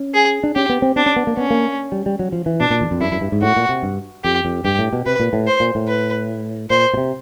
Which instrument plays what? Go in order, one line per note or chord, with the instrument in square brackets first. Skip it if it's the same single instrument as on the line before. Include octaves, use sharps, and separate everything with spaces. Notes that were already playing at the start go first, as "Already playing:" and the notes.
Already playing: [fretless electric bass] C#4
[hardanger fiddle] G#4
[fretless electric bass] D4
[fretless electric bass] C#4 [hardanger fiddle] G4
[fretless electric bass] B3
C4
[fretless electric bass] C4 [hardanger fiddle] D4
[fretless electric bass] C#4
B3
A#3
[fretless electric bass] B3 [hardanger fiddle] C#4
[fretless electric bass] A#3
G3
G3
F#3
F3
E3
[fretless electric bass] B2 [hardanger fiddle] D4
[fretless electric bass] A#2
E2
F2
[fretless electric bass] F#2 [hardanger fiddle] E4
[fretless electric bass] F#2
G2
G#2
[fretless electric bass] A2 [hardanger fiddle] F#4
[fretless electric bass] A#2
C3
G2
[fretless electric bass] F2 [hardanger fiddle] G4
[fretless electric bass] F2
[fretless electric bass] G2 [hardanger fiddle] G4
[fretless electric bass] A2
B2
[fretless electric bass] C3 [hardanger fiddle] B4
[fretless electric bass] A#2
A2
[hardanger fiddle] C5
[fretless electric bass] A#2
A2
[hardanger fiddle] B4
[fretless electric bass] A#2 [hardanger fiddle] C5
[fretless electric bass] B2
C3